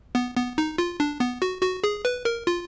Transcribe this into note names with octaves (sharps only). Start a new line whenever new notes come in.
B3
B3
D#4
F4
D4
B3
F#4
F#4
G#4
B4
A#4
F4